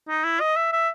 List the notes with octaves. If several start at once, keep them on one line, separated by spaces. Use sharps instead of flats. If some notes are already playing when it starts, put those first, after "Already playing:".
D#4
E4
D#5
E5
E5